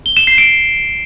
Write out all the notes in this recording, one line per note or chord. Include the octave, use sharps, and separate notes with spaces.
G7
E7
C7
D7